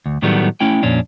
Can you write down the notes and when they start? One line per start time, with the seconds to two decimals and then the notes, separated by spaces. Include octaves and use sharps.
0.06 D2
0.22 A2 D#3 F#3 G3 A3 B3
0.60 A3 C#4 E4 G5
0.83 F2 A#2 C#4 D4